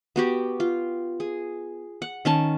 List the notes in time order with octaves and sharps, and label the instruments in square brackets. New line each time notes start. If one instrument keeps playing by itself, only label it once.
[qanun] B3 F#4 G4
F4
G#4
F#5
D#3 C#4 A5